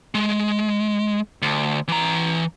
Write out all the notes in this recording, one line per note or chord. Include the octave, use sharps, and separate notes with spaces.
G#3
D2
E3 A#5